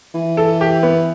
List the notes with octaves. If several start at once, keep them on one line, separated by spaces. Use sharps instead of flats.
E3
A4
G4
B3